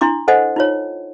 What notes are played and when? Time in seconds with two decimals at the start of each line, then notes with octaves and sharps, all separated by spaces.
0.01 D4 E4 C6 D6
0.28 A4 C5 D#5 F#5 G#5
0.56 D#4 F4 C#5